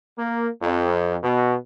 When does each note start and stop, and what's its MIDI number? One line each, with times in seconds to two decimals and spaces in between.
0.17 0.48 58
0.62 1.17 41
1.22 1.55 47